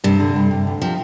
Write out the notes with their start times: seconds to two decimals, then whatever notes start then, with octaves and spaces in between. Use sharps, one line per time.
0.04 G2 C3
0.19 D3
0.36 G2
0.51 G2
0.67 D2
0.81 C3 F3